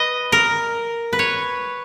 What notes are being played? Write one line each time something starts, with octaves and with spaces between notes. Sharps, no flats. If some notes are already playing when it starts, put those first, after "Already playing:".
Already playing: B4 D#5
A#4
B4
C#5